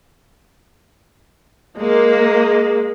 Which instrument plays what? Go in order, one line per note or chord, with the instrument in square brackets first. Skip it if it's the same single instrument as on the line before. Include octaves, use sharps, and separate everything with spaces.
[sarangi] G#3 [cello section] A#3